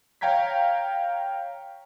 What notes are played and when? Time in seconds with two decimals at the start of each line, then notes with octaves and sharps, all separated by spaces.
0.21 C#5 F5 G5 A#5 G#6 B6